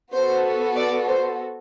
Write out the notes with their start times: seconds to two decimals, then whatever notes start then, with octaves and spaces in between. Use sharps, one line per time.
0.12 B3 F#4 A4 C5
0.76 D5
1.08 C5